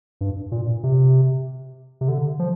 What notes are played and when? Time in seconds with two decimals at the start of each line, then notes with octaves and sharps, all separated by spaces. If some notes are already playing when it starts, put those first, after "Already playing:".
0.21 G2
0.52 A#2
0.83 C3
2.01 C3
2.08 D3
2.39 F3